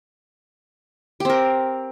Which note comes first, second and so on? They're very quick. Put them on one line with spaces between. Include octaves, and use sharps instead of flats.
G4 C4 A#4